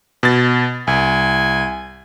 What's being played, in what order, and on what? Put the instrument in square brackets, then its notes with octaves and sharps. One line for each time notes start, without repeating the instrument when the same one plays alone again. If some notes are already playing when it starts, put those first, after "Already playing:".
[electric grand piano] B2 A6
[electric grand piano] C2 [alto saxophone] G#5